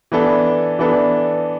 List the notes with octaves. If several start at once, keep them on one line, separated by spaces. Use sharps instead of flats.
E3 B3 D4 A4
E3 B3 D4 A4